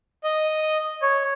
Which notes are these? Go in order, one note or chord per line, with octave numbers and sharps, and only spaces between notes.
D#5
C#5